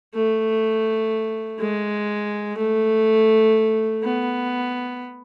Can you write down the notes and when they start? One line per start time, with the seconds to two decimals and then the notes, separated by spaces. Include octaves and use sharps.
0.14 A3
1.60 G#3
2.58 A3
4.03 B3